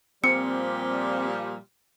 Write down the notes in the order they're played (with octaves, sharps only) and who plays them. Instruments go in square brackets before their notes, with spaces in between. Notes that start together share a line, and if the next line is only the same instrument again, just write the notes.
[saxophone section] A#2 F3 G3 [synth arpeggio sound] C4 [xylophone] C#7